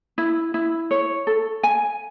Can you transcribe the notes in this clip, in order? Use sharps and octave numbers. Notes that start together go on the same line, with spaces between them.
E4
E4
C#5
A4
G#5